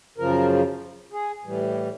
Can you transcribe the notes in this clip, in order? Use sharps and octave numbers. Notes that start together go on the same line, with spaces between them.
F#2 C#3 F3 A#4
G#4
A2 E3 G3